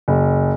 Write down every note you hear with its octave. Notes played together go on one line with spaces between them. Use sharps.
F#1